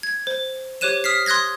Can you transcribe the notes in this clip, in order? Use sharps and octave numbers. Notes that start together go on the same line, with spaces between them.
G#6
C5
G4 C5 C#5 F#6 D#7 E7
D#6 F6 B6 C7
C6 D#6 F#6 G#6 A#6